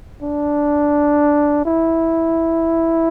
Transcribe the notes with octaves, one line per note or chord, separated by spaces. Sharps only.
D4
E4